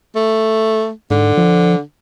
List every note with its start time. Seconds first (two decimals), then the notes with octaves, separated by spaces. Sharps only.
0.15 A3
1.10 G#2 D3
1.37 F3